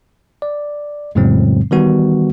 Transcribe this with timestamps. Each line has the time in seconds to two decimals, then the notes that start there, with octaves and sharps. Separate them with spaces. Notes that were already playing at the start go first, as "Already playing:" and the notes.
0.42 D5
1.15 F2 A2 C#3 F#3 G#3 C4
1.71 D#3 E3 G3 B3 F#4